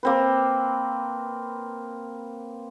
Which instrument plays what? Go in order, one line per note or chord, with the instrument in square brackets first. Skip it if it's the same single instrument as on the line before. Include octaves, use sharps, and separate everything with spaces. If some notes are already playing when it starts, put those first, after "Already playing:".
[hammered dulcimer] A#3 C4 B4